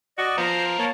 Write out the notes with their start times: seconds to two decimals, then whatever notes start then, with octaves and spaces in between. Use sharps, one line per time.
0.18 F#4 D5 D#5
0.38 F3 B3 A#4 C5 A#5
0.79 A#3 C#5 A5